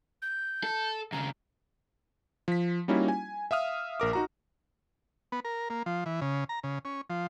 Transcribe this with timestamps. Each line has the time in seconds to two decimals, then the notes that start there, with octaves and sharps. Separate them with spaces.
0.22 G6
0.63 A4
1.12 D#2 C#3 A#5
2.48 F3 B6
2.88 G3 A#3 C#4 D#4 E4 F#4
3.08 G#5
3.51 E5 F5 D#6 F6
4.00 A#1 A#4 D6
4.13 D#4 F#4 A#5
5.32 B3
5.45 A#4
5.70 A#3
5.86 F3
6.06 E3
6.21 C#3
6.49 A#5
6.64 C#3
6.85 C#4
7.10 F3